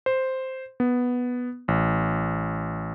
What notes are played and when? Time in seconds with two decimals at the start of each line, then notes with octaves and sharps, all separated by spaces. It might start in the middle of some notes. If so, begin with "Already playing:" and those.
0.06 C5
0.80 B3
1.68 A1